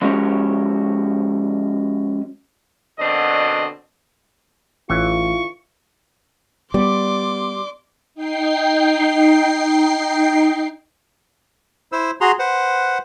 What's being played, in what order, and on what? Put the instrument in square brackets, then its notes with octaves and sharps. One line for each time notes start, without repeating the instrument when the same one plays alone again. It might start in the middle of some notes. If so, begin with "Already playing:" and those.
[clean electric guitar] F3 G#3 C#4 F#4 G4 C#5
[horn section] F#2 B2 D3 C4 D5 D#5
[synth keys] A1 [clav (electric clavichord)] E3 [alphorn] F4 [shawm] C#6
[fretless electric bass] G3 [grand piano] B3 [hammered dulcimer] D5 [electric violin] C6 D6
[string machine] D#4 G5 C7
[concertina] E4 C5 E6
F#4 G#4 A#5 C6
B4 C5 F#5